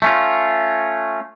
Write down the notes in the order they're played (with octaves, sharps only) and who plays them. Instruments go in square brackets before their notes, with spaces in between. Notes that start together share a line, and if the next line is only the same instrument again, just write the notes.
[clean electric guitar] A3 C#4 F4